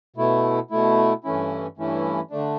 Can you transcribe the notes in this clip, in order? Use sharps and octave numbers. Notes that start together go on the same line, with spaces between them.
B2 A3 E4
B2 A3 E4
G2 E3 A3 C#4 E4
G2 E3 A3 C#4 E4
D3 A3 D4